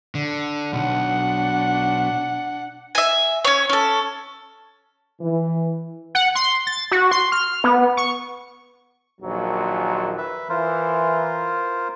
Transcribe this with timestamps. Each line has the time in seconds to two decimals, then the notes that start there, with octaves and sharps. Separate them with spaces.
0.15 D3
0.73 B1 D4 F#5
2.95 E5 G#5
3.45 C#4 C#5
3.69 C#4 A4
5.21 E3
6.15 F#5
6.35 C6
6.67 A6
6.91 F#4
7.11 C6
7.32 F6
7.64 B3
7.97 C#6
9.21 A#1 D#2 F#3
10.18 B4 E5
10.49 E3 F4 A#4 C5